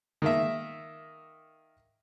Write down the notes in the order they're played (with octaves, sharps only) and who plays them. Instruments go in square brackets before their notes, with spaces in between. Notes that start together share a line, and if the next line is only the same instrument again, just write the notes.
[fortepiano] D#3 A#3 E5